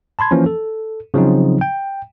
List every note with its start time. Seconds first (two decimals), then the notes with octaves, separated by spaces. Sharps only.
0.19 A5 B5 C6 G#6
0.31 E3 F3 A#3 C#4
0.46 A4
1.14 C#3 F3 F#3 C4 D#4
1.61 G5